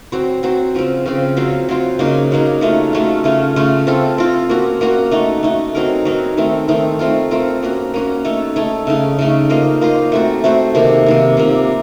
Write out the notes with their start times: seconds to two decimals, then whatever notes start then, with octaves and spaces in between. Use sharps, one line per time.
0.12 F#3 C4 F#4 C5
0.43 F#3 C4 F#4 C5
0.74 C#3 F3 C4
1.06 C#3 F3 C4
1.37 F#3 C4 F4 C5
1.69 F#3 C4 F4 C5
1.99 C#3 F#3 A#3 D#4
2.31 C#3 F#3 A#3 D#4
2.61 F#3 A3 C#4 F4
2.93 F#3 A3 C#4 F4
3.24 C#3 A3 C#4 F4
3.56 C#3 A3 C#4 F4
3.87 C4 F4 A4
4.18 C4 F4 A4
4.50 A#3 C#4 F#4
4.81 A#3 C#4 F#4
5.11 A3 D#4 F#4
5.43 A3 D#4 F#4
5.75 F#3 C4 D#4 A#4
6.05 F#3 C4 D#4 A#4
6.37 D#3 A3 C4 D#4
6.68 D#3 A3 C4 D#4
6.99 A3 C4 F4 A#4
7.31 A3 C4 F4 A#4
7.62 A#3 C#4 F#4
7.94 A#3 C#4 F#4
8.25 A3 D#4 A4 C#5
8.56 A3 D#4 A4 C#5
8.87 C#3 A3 D#4
9.19 C#3 A3 D#4
9.50 A#3 F4 C5 D#5
9.81 A#3 F4 C5 D#5
10.12 A3 C4 F#4 C5
10.44 A3 C4 F#4 C5
10.75 C3 D#3 A#3
11.06 C3 D#3 A#3
11.37 C3 F3 A#3